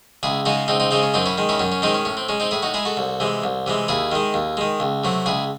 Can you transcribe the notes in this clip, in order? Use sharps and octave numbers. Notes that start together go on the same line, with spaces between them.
C#2 E4 G#4
C#3 G#3 D#4 F#4
C#2 C4 D#4
C4 D#4
C#3 G#3 C4 D#4
C#4
F#2 C4 D#4
C#4 E4
D#3 G#3
C#4 E4
F#2 C#4
C#4
D#3 G#3 C4 D#4
C#4
A2 C#4
C4
G#3 C#4
C4 D#4
A2 E4 G#4
D#4 F#4
G#3 E4 G#4
F#4 A4
C2
C3 E3 G#3
C2
C3 E3 G#3
D#2 E4 G#4
D#3 G#3
D#2
D#3 G#3
C#2
C3 F#3 A3
C#2 E4 G#4